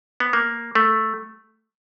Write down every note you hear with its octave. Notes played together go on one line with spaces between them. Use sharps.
B3
A#3
A3